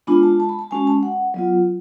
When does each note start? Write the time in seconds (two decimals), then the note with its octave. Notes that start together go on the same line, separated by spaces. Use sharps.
0.07 G#3 B3 D4 F4 B5
0.23 A5
0.40 A5
0.49 B5
0.59 A5
0.71 G#3 C#4 F#4 G#5
0.87 A5
1.03 F#5
1.34 F#3 B3 F4